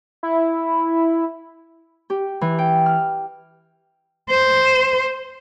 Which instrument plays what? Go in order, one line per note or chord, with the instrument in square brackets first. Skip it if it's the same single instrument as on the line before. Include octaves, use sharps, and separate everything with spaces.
[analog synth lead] E4
[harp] G4
E3
G5
F6
[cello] C5